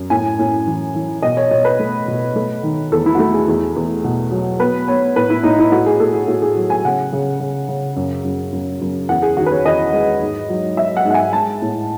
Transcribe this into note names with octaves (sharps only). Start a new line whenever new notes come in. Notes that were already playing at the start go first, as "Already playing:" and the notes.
Already playing: F#2
A2 G#5
A2
E3
E3
B2 D#5
C#5
B2 C#5
B4
A3
B2
A3
D#3
E2 A4
E4
F#4
A3 E4
G#4
E2
E2
B2
F#3
B3 B4
B3 C#5
A2 B4
E4
A2 D#4
E4
A3 F#4
G#4
A2 A4
G#4
A2 F#4
G#4
F#3
G#5
C#3 F#5
C#3
C#3
C#3
F#2
F#2
F#2
F#2
E2 F#5
G#4
D#3 F#4
B4
C#5
E2 D#5
G#3
G#2
F#3
F#3 E5
F#5
G#2
F#5
G#5
G#3 A5
A2